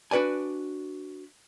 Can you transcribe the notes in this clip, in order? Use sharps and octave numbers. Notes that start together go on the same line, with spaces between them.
D4 F#4 B4 D5 G#5